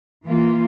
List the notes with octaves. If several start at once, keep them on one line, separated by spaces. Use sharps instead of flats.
E3 A#3 F4